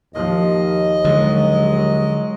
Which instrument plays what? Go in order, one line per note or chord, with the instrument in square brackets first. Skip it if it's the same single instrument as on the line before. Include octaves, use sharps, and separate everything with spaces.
[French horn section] D#2 [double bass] F3 [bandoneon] D#5
[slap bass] D3 F3 [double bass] F#3 G#3